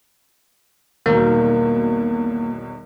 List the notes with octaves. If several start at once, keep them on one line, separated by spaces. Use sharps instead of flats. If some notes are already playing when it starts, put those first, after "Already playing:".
B1 E2 B2 D#3 G3 A#3 A#4